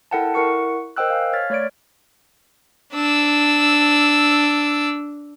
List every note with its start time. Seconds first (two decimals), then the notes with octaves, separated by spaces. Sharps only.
0.11 E4 A4 A#4 F#5 G5 A5
0.34 E4 A#4 F#5 C#6 C#7
0.96 A#4 C5 D#5 G5 E6 F#6
1.10 F5 G#5
1.33 C#5 F6 G#6 A6 B6
1.50 A3 C#5 D5 G#6 D7
2.93 D4 E6